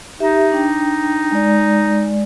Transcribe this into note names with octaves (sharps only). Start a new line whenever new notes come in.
D#4 G4 E5
D4 G5
G#3 D5